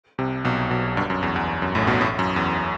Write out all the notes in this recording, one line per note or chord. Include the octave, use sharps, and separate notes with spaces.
C2 C3
B1 B2
B1 B2
G1 G2
F#2
E2
E2
F#2
A1 A2
B1 B2
A1 A2
F#2
E2